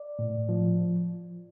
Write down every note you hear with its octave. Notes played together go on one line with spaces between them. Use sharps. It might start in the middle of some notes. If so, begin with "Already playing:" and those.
Already playing: D5
A2
F3